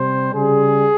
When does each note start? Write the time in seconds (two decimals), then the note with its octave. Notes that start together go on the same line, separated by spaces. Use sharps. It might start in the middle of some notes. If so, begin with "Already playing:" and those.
Already playing: C3 G3 C5
0.34 C#3 G3 G#4